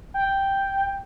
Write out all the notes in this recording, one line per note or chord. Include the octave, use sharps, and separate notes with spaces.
G5